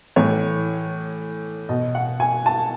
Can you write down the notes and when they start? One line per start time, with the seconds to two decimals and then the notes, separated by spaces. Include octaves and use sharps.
0.16 A2 E3 C#5
1.69 B2 D#5
1.95 F#5
2.20 G#5
2.46 A5